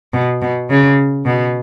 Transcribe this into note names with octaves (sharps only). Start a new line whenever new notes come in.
B2
B2
C#3
B2